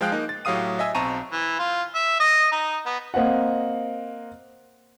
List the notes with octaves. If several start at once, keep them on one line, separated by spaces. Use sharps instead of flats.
F3 G#3 C5 F5 G5 F#6
A#3 D#4
A6
A2 F#3 G4 F5 D#6 D#7
D#5 E5 G#5 E6
B1 C4 A5 A#5 C#6 D#7
E3
F4
E5
D#5
D#4
B3
A#3 C4 D#5 F#5